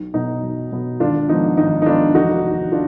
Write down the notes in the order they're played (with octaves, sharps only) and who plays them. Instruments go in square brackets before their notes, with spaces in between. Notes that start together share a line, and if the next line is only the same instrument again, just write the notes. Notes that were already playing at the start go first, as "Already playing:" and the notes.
Already playing: [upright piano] B1
B2 F#3 B3 D#4
B1
B2 F#3 B3
G#1 D4 F4
G#2 F3 B3 D#4
G#1 D#4
D#4
G#2 F3 B3 D4 F4
F1 D#4 F#4
D#2 D#3
D4 F4